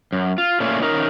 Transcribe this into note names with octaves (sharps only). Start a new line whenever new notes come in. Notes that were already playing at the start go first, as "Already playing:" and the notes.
F#2
F4
A#2 A3 C#4 F4
C#4 D#4 A#4